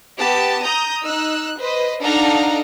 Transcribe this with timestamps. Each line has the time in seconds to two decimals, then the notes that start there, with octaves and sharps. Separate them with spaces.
0.19 B3 G4 A5
0.62 A#5 D#6 G6
1.04 D#4 E6 F#6
1.58 B4 C5 D#5
2.02 D4 D#4 A4 F5 F#5 A#5